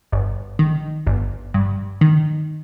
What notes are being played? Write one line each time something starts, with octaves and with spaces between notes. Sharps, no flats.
G1
D#3
G1
G2
D#3